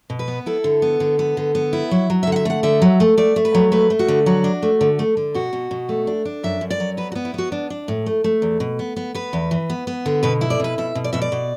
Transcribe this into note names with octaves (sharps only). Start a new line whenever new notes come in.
B2
B4
B3
E4 A4
D3
B3
D3
B3
D3
B3
E4
F#3
F#3
E5
D3
F#5
E5
A3 F#5
D3 E5
F#3
A3
A3 D5
A3
B4
F#3
A3 B4
A3
F#4
D3
F#3 F#4
D4
A3
D3
A3
D3
B2 F#4
B2
B2
A3
D4
D4
F#2 E5
F#2
D5
F#3
B3 B4
F#4
B3
E4
B3 F#4
D4
D4
A2
A3
A3
E2
B2
B3
B3
B3 B4
E2
E3
B3
B3
D3
B2 B4
E4
D5
B2 B4
B2 E5
B2
D5
B2 E5
D5
B2